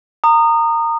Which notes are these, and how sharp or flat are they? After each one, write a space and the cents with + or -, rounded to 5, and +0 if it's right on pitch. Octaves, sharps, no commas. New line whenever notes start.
A#5 -20 D#6 -20